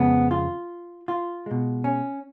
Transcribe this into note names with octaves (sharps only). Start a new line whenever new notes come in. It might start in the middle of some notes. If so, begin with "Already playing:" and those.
Already playing: F2 C#3 G#3 B3
F4
F4
B2 G#3
C#4